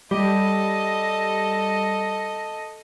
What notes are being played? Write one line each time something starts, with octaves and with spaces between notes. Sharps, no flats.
G3 A4 D#5